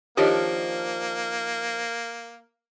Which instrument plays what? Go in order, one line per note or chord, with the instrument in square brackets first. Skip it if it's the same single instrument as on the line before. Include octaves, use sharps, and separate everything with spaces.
[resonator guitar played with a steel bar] D#3 F3 D4 [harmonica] A#3 [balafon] G4 C#5 D#5